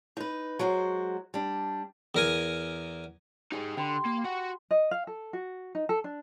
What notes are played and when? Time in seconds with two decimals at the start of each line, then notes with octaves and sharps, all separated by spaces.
0.17 D#4 B4
0.59 F#3 G#3 F#4 C5
1.34 G3 D4
2.15 E2 A#4 G#5
3.52 D#4 G4 G#4 G#5 E6
3.77 D3 G5 B5 C6
4.05 A#3
4.24 F#4 F#5
4.71 D#5
4.91 F5
5.07 A4
5.33 F#4
5.75 D#4
5.89 A4
6.04 D4